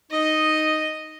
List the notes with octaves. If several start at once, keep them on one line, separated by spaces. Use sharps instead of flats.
D#4 D#5